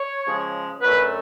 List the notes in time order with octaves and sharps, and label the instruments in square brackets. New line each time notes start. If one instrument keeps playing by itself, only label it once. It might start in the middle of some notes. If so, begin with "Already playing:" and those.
Already playing: [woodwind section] C#5
C#3 F3 G#3
F#2 D3 F#3 A3 C#4 B4